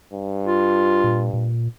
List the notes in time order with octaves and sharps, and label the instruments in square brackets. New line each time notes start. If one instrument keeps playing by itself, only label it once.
[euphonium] G2
[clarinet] F4
[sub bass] A#2
A#2